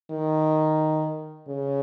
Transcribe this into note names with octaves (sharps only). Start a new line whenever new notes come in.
D#3
C#3